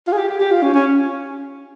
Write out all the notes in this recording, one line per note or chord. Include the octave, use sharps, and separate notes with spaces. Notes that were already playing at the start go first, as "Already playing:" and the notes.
F4
G#4
G4
G4
G4
F4
C#4
C#4